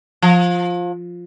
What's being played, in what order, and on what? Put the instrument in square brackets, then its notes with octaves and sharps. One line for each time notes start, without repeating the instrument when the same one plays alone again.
[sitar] F3